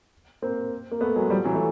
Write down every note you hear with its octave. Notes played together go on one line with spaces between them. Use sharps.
A#3 C4
A#3
A3 B3
F#3 G#3
F3 G3
E3 F#3
A3